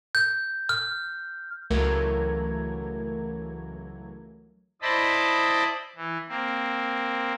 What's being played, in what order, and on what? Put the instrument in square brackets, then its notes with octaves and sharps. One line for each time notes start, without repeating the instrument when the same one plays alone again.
[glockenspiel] G6
F6
[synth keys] C#2 E3 F#3 A3 A#4 G#6
[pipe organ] E4 C5 D5 D#5 A5 B5
E3
A#3 C4